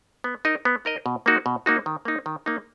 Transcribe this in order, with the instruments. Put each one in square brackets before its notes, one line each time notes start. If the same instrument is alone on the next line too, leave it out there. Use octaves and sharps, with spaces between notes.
[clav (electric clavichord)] B3
D#4 A#4 D#5
B3
D#4 A#4 D#5
B2
A#3 D#4 F#4
B2
A#3 D#4 F#4
D#3
A#3 D#4
D#3
A#3 D#4